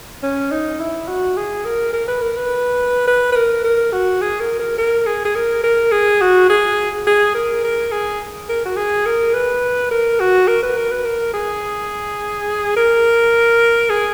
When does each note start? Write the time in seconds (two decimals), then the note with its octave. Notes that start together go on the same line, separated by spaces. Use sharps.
0.23 C#4
0.52 D#4
0.80 E4
1.08 F#4
1.37 G#4
1.65 A#4
1.93 A#4
2.08 B4
2.22 A#4
2.37 B4
3.07 B4
3.32 B4
3.36 A#4
3.64 A#4
3.93 F#4
4.22 G#4
4.40 A#4
4.60 A#4
4.78 A#4
5.06 G#4
5.25 G#4
5.35 A#4
5.64 A#4
5.92 G#4
6.21 F#4
6.49 G#4
7.07 G#4
7.35 A#4
7.64 A#4
7.92 G#4
8.49 A#4
8.65 F#4
8.77 G#4
9.06 A#4
9.34 B4
9.91 A#4
10.20 F#4
10.48 A#4
10.63 B4
10.77 A#4
10.91 B4
11.05 A#4
11.34 G#4
12.76 A#4
13.90 G#4